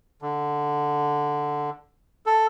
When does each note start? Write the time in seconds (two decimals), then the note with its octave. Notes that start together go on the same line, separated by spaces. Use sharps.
0.22 D3
2.26 A4